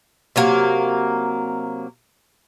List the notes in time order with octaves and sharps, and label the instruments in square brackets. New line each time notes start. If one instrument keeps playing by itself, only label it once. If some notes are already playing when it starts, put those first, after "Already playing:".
[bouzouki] C3 F#3 A#3